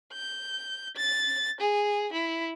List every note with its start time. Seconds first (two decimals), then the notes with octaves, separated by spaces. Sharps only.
0.13 G6
0.97 A6
1.60 G#4
2.13 E4